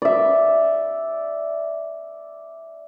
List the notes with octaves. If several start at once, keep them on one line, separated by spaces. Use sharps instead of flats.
D5 E5